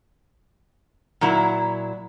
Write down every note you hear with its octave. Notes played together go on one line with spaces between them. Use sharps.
A#2 F#3 E4 A#5